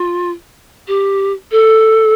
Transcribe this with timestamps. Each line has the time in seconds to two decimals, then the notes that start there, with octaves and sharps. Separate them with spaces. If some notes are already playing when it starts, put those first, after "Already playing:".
Already playing: F4
0.88 G4
1.51 A4